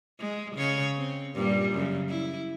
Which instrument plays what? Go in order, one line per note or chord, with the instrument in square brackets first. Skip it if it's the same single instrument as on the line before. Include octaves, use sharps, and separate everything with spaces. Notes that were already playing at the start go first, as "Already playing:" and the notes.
[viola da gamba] G#3
C#3 C#5
C4
G2 A#2 G3
F#2 C#3
E4